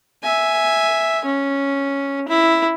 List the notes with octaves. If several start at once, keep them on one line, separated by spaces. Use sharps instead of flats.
E5 G#5
C#4
E4